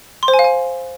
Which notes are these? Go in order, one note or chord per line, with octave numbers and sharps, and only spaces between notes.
C6
C5
G#5
F5
G#5